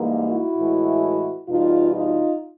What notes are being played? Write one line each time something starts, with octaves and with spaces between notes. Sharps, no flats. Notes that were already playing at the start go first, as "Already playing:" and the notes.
Already playing: G#2 E3 G3 A#3
E4 F#4
A2 E3 G#3
E2 B2 G3 D#4 F4
D#4 F4